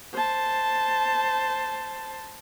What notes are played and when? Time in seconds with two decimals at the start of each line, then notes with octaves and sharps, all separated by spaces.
0.14 C5 A5